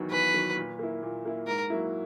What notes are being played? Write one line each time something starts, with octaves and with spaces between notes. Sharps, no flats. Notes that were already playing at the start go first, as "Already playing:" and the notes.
Already playing: E2 D#3 F#3
E2 B4
D#3 F#3
A#2
A#3 E4
A#2
A#3 E4
G#2 A#4
F#3 A#3 E4